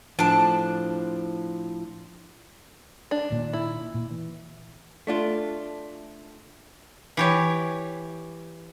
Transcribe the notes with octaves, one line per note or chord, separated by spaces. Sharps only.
A2 F3 D4 A5
D4
A#2 D#3
E4
A#2
E3
A3 D4 F4
E3 G4 C#5